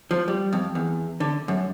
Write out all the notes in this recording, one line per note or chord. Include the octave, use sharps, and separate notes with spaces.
F3
G3
F2
E2
D3
F#2